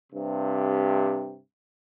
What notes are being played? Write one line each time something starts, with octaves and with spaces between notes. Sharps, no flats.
G2 C3